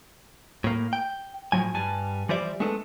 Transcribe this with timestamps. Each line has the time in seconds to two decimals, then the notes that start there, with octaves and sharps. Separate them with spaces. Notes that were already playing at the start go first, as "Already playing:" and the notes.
0.64 A2 A#3
0.93 G5
1.52 A2 F3 F#3 G#5
1.74 G2 G3 G#5 A5
2.29 E3 F3 G3 C5 D5 E5
2.60 G#3 A3 B3 D4 A4